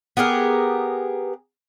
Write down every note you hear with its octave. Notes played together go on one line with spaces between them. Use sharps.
B3 G4 G#4 A#4